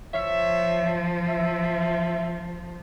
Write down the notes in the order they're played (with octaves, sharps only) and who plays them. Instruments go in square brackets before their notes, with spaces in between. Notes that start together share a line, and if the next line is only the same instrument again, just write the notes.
[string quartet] F3 [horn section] C#5 E5
[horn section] E5